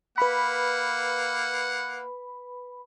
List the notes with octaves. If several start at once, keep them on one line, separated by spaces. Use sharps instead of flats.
A#3 B4 F#5 B5